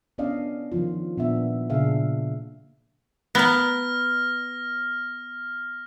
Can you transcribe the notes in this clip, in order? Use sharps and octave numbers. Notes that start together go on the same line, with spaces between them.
B3 C#4 D4 D5 D#5 F5
D#3 F3 F4
A#2 B3 D4 E5
A#2 C#3 D4 G#4 E5 F5
B3 A#5 F6 A#6